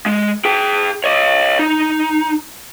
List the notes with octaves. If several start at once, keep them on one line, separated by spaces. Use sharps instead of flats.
G#3
G#4 G5
C#5 D#5
D#4